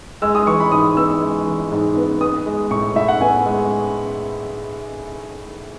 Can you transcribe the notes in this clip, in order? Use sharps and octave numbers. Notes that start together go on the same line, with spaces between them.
G#3 E6
D#6
E3 C#6
B5
G#2 D#6
B3 E6
G#3
E3
G#2
B3
B3 D#6
G#3
A2 C#6
A2 E5
F#5
B3 G#5
G#3